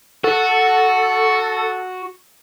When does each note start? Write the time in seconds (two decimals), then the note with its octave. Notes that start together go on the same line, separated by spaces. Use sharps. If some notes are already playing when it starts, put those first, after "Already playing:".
0.24 F#4 A4